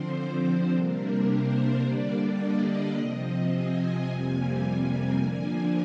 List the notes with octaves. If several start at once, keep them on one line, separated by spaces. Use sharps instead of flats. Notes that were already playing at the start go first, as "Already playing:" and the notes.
Already playing: D3 F3 C4 C5
C3 G3 A#3 D4 A#4
C5
D3 G3 A#3 D4 D5
D#5
C3 F3 C4
G#5
F2 C3 G3 A#3
D3 F3 A#3 D4